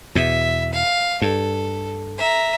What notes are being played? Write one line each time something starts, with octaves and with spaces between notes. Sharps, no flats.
E2 B2 E5
F5
G2 A4
E5 A#5